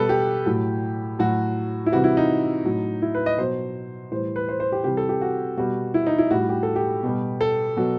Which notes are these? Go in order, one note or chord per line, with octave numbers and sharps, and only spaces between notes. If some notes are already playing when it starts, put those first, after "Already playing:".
Already playing: B2 G3 A4 B4
G4
A2 F#3
A2 F#3 F#4
E4
C3 E3 G3 F#4
E4
D#4
A2 F#3
E4
B4
D#5
B2 F#3 C5
A2 E3 G3 C5
B4
C5
C5
G4
C3 E3 G3 G4
A4
G4
F#4
B2 G3 F#4
E4
D#4
E4
A2 G3 F#4
G4
A4
G4
B2 G3
A4
B2 F#3